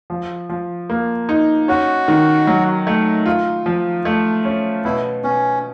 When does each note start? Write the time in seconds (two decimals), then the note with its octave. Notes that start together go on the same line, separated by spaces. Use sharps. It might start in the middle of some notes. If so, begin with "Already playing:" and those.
0.10 F3
0.49 F3
0.90 A#3
1.29 D#4
1.68 C#4 F#4
2.08 D#3
2.47 F#3
2.87 A3
3.26 F4
3.66 F3
4.05 A3
4.45 C#4
4.84 B2 E4
5.23 B2 C#4